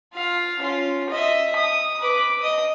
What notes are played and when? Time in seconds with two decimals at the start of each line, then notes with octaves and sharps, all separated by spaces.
0.14 F4 F5
0.60 C#4 F4
1.10 D#5 E5
1.56 D#6
2.00 B4 D6
2.41 D#5 D#6